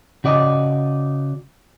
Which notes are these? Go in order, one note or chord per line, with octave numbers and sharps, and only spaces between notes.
C#3 F#4 D5 D#5